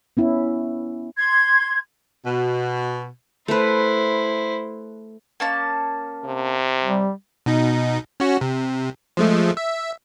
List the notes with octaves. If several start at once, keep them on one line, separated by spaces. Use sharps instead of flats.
B3 C#4 E4
C6 G#6
B2
A3 E4 B4 C5
A#3 C#4 A5
C3
G3
B2 D#4
C#4 F#4
C3
F3 G#3 A3
E5